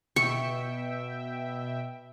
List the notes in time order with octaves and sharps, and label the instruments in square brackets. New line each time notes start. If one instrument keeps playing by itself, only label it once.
[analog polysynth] B2 E5 G5 [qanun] C#6